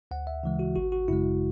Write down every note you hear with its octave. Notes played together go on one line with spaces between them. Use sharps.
D2 F#5
E5
C#3 E3 G#3
F#4
G#1 F#4
F#4
F#2 C#3 G#3 E4